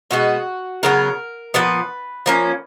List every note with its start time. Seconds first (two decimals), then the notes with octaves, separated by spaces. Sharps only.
0.11 B2 G#3 B3 F#4
0.83 C#3 F#3 B3 A#4
1.54 A#2 F3 B3 B4
2.26 F3 A#3 C#4